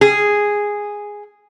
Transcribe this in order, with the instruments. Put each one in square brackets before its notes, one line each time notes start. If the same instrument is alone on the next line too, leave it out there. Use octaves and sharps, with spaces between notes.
[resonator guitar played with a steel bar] G#4